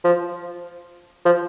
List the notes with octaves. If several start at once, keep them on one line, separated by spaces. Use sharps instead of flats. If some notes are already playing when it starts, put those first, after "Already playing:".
F3
F3